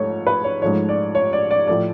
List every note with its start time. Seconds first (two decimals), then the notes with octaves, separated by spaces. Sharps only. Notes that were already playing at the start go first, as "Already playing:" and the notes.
Already playing: G#2 F3 A3 C#5
0.27 B4
0.44 C#5
0.62 G#2 F3 A3 C#5
0.89 D5
1.15 C#5
1.33 D5
1.51 D5
1.67 A2 F3 A3 D5